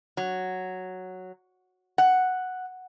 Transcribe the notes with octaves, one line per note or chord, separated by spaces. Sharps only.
F#3
F#5